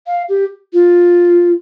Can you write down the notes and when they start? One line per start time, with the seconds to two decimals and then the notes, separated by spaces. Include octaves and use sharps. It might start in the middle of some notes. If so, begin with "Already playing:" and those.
0.07 F5
0.29 G4
0.73 F4